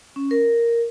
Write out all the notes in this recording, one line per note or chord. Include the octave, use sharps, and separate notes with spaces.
C#4
A#4